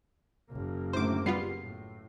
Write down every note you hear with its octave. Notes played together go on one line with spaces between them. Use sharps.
F#1 A#3
F#2 A2 D3 C5 D6
G3 B3 F4 C7
A2